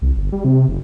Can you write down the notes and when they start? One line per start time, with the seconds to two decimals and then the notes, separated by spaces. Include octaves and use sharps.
0.02 C2
0.17 G1
0.32 G3
0.44 C3
0.68 F#1